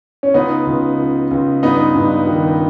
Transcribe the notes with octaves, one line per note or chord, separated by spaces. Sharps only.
C#4
C#2 B3 D#4
C#2
C#2
C#2
G2 B3 D#4
G2
D#3